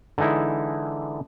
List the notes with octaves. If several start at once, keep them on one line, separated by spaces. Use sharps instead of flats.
D3 E3 G#3 D#4 E4